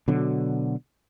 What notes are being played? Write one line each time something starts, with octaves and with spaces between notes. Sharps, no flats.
B2 D3 F#3